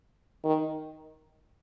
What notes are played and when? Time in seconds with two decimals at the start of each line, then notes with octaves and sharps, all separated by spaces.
0.44 D#3